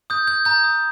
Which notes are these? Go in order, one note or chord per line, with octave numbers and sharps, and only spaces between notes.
D#6 G6
G6
A#5 G6
D#6